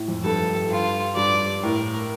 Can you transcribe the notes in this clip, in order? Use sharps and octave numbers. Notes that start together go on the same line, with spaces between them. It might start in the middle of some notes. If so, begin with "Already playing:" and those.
Already playing: A2
F2
G2 A4
G2 F4
G2 D5
A2 A#4